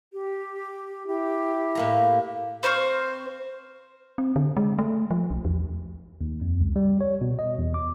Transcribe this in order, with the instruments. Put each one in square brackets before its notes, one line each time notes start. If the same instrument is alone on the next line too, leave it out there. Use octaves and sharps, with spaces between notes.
[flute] G4
[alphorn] E4 [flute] G4
[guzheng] A2 A#3 A#5
[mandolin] C4 C5 C#6 F6
[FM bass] C4
D3
G#3
A3
F3
B1
E2
[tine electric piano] D#2
F2
C#2
G3
C#5
B2
D#5
E2
D6